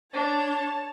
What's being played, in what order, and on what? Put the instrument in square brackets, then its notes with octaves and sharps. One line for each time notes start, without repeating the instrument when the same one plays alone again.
[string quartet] D4 [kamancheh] C#5 A5